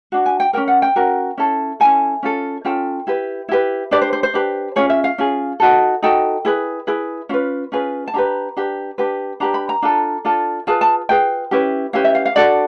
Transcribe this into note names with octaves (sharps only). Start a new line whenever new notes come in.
D4 F#4
G#5
G5
C#4 F#4 A#4 G5
F#5
G5
C#4 F#4 A#4
C#4 E4 A4
C#4 E4 A4 G#5
C#4 F4 A4
C#4 F4 A4 G5
E4 G4 B4
E4 G4 B4
D4 G4 B4 D5
C5
C5
C5
D4 G4 B4
C#4 F4 G#4 C#5
E5
F5
C#4 F4 G#4
D#4 F#4 A4
D#4 F#4 A4 G5
E4 G#4 B4
E4 G#4 B4
C#4 F4 B4
C#4 F4 G#4 B4
A5
D4 G4 B4 A#5
D4 G4 B4
D4 G4 B4
D4 G4 B4 A#5
B5
A#5
D4 F4 A4
D4 F4 A4
F4 G#4 B4 A5
A5
F4 G#4 B4 G5
C#4 E4 G4 B4
C#4 E4 G4 B4 F5
E5
F5
F5
D4 F#4 A4 D5